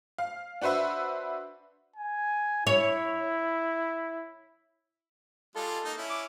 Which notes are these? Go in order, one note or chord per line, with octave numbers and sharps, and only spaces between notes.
F5
D4 F#4 B4 C5 E5
G#5
E4 C#5
G3 G#3 F4 A4
A#3 D#4
C#4 E4
D6